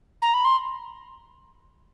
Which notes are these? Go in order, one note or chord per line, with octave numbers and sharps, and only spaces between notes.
A#5
B5
C6